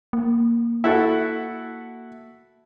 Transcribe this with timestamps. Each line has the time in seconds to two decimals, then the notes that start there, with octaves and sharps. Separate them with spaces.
0.13 A#3
0.84 E4 F#4 A4